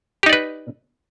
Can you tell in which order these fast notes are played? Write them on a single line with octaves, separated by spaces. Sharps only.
G4 D#4 D5 B4